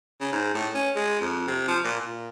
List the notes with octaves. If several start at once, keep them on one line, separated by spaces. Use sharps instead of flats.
C#3
G#2
A2
C#4
G#3
F2
C3
F3
A#2
A#2